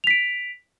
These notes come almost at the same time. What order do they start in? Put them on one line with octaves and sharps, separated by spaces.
F7 B6 D7